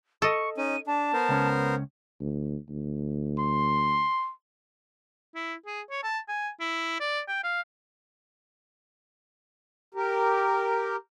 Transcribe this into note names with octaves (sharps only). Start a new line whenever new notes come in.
A4 D#5 C#6
C#4 D#4 D#7
D4 A5
B3 A#4 C5
C#2 C#4
D2
D2
C6
E4
G#4
C#5
A5
G#5
E4
D5
G5
F5
G4 A#4